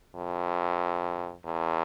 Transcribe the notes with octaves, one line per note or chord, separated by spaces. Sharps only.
F2
E2